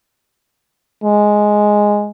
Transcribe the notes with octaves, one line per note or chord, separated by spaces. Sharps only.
G#3